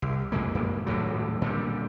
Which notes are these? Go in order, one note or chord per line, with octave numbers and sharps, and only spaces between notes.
C2
F2 G#3 A#3
F#2 A#2
D#1 D2 A2 F#3
A#2 D3 F#3 G3